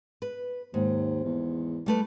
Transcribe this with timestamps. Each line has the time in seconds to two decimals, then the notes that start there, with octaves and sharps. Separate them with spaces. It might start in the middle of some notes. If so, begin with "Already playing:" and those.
0.22 B4
0.74 D#2 G#2
1.24 E2
1.86 G3 A3 B4